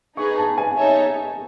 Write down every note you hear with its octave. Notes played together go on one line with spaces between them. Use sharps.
D#4 G#4 B4 C#6
A5
G#5
D#4 A4 C#5 E5